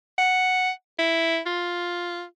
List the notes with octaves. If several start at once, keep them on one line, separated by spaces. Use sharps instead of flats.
F#5
E4
F4